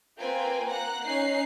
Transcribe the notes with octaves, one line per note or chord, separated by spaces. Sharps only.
A#3 C4 F4 B4 G5 G#5
A#3 F#5 A#5 F#6
C#4 D#4 F#6 C7